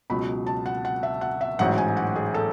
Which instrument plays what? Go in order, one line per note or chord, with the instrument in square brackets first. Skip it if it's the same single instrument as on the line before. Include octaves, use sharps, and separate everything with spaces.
[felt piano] C#2 B2 F#3 B5
A5
F#5
F#5
E5
F#5
E5
A1 G#2 F#3 F#5
G#5
F#5
G#4
A4